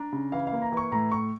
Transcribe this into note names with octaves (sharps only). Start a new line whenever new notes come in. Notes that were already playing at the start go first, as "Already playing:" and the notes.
Already playing: D4 A#5
C#3
E3 F5
F5
A#3
A#5
E3 C#6
A2 A#5
A2 C#6